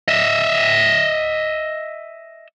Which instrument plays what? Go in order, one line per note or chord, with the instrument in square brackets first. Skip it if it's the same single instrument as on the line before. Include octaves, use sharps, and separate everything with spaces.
[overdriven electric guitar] D#5 E5